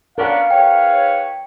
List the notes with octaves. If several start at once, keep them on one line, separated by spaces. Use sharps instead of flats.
B3 C#4 D4 A#4 F5 F#5
G#2 B4 C#5 G5